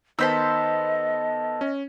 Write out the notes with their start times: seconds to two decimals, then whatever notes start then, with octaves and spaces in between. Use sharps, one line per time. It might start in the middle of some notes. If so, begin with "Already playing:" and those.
0.19 D#3 B3 A4 C5 D#5 E6 B6
1.61 C#4